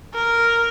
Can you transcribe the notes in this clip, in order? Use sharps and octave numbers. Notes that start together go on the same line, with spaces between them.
A#4